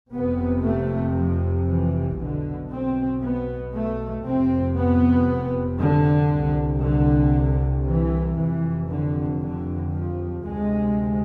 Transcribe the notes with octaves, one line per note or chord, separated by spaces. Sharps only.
F1 F2 C3 B3
A3
F3
E3
B1 B2 D3
C4
B3
A3
F1 F2 C3 C4
B3
D3
C2 C3
D3
E3
F1 F2 C3 E3
D3
D3
F3
D2 C3 G#3